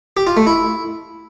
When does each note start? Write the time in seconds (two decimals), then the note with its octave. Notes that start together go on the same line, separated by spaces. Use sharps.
0.17 G4
0.27 F4
0.37 A3
0.47 E4